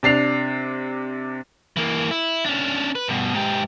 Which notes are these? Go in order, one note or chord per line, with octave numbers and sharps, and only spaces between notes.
C3 D4 C7 F7
E3 A#3
E4
C#4 D4
B4
G2 B2
G#2 G4